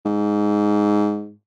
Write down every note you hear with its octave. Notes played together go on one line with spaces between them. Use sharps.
G#2